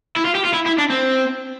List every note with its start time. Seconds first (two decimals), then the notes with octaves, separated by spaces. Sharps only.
0.17 E4
0.25 F4
0.35 G4
0.44 F4
0.54 E4
0.66 E4
0.79 D4
0.90 C4